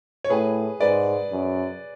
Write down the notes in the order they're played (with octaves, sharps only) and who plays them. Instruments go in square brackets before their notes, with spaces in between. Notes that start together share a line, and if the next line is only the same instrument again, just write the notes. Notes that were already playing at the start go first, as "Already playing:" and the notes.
[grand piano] C#5
[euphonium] A2 [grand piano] G#4 B4
[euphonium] G#2 [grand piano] B4 D5
[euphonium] F#2